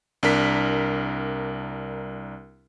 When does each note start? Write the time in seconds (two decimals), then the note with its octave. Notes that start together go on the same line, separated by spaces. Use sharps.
0.23 C2 D4 A#4 B6